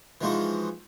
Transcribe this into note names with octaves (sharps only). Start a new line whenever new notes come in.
E3 F3 G#3 D#4 F#4